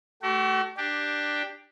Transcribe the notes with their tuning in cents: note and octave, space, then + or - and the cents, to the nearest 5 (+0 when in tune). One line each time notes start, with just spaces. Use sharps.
A3 +0 F#4 +45
D4 +10 G4 +0